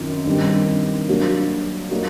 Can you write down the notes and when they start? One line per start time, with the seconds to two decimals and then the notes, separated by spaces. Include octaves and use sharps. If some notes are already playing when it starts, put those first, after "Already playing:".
Already playing: F#2 D#3 C4 F4
0.26 G2 D#3 G3 C4
1.08 F#3 A#3 D4 F#4
1.91 F#3 A#3 D#4 F#4